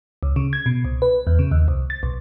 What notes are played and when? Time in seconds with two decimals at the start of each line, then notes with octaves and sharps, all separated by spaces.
0.23 C#2
0.36 C#3
0.53 G#6
0.66 B2
0.85 C2
1.02 B4
1.27 E2
1.39 C#3
1.51 D#2
1.68 C2
1.90 A6
2.03 B1